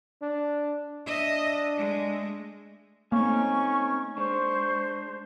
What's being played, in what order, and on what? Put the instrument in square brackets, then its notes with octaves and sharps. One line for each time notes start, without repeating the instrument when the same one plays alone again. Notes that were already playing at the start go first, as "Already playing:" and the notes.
[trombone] D4
[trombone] D4 [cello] D#5 E5
[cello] G#3 A3
[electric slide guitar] A3 C4 D#4 [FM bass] A#3 [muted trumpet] C#4 [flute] C#6
[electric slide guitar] G#3 D4 [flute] C5 [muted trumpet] C#6